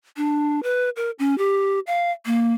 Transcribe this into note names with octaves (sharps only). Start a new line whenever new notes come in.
D4
B4
A#4
C#4
G4
F5
A#3